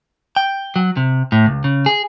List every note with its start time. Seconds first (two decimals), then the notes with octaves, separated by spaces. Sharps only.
0.36 G5
0.76 F#3
0.97 C3
1.32 A2
1.46 C#2
1.64 C#3
1.86 G#4